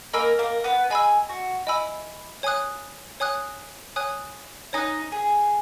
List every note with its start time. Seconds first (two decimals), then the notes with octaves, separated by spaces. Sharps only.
0.13 A#3 A#4 D#5 G#5 B5 E6
0.39 A#3 A#4
0.64 B3 B4
0.90 G#4 D#5 G#5 B5 E6
1.29 F#4
1.66 E4 D#5 G#5 B5 E6
2.43 C#5 G#5 D#6 F#6
3.20 C#5 G#5 D#6 F#6
3.96 C#5 G#5 D#6 F#6
4.73 D#4 C#5 G#5 D#6 F#6
5.12 G#4